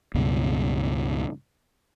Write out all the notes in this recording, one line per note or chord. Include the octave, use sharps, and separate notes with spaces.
C#2 G2 B2